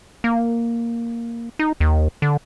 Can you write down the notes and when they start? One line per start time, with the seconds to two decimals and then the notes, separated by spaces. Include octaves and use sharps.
0.24 A#3
1.59 D#4
1.80 D#2
2.22 D3